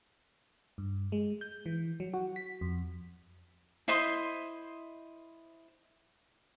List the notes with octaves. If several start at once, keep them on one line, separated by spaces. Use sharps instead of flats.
G2
G#3
G6
E3
F#3
F#4
B6
F2
E4 C5 D#5 C6